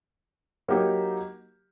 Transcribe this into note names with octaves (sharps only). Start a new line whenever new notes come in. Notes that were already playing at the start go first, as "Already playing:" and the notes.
F#3 A#3 D#4 G4